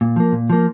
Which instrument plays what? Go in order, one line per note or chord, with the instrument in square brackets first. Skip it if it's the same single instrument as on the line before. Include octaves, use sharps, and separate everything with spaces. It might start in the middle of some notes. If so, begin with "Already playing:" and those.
[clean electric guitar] A#2
F3 A#3
A#2
F3 A#3